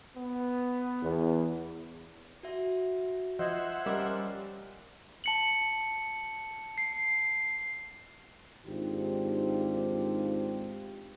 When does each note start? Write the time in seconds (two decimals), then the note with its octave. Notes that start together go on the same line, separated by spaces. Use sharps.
0.16 B3
1.03 E2
2.43 F#4 E5
3.39 F3 C5 D#5 E5 F#5 G6 G#6
3.86 G3 C#4 A#4 D#5 D6 E6
5.24 A5 C#7 F#7
6.78 C7
8.66 G#2 D#3 C4 D4 F4 G4